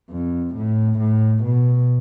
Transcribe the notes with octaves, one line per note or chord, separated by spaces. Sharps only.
F2
A2
A2
B2